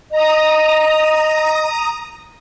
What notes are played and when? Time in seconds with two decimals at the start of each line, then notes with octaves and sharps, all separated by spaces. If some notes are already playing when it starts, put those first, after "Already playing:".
0.12 D#5 A#5 D#6